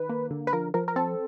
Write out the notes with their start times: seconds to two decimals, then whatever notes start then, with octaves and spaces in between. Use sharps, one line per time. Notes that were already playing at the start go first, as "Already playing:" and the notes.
Already playing: D#3 B4
0.09 A#3
0.31 D3
0.47 B4
0.53 F3 A#4
0.74 F3 A#4
0.88 A#4
0.96 C4 A4